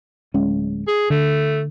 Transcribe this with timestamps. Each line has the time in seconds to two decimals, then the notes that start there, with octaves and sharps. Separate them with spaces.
0.34 D1 G#3 C#4
0.88 G#4
1.10 D3 A3